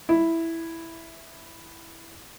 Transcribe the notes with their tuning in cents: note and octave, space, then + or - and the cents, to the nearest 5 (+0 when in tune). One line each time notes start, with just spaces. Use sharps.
E4 +0